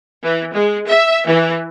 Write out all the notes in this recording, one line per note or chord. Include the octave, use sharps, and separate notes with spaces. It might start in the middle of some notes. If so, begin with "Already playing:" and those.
E3
G#3
E5
E3